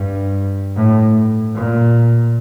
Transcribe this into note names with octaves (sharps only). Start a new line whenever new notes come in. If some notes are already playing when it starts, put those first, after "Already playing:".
Already playing: G2
A2
A#2